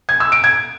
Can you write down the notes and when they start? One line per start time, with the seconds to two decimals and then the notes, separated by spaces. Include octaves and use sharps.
0.09 G#6
0.20 E6
0.32 D7
0.44 G#6